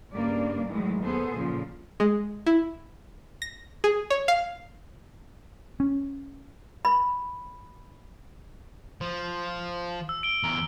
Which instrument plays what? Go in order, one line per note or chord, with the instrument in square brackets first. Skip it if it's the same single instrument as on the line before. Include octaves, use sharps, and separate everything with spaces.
[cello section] G2 C#3 G3 A#3 D4 D5
A2 D#3 E3 F#3 G#3
D#2 B3 G#4 A4 C5
A#2 C#3 F3
[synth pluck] G#3
E4
A#6
G#4
C#5
F5
[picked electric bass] C#4
[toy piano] B5
[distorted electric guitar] F3
[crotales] E6
D7 G7
[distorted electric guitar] E2 A#4